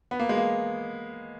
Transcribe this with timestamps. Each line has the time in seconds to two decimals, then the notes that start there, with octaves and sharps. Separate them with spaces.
0.11 B3
0.20 A#3
0.29 G#3
0.37 A#3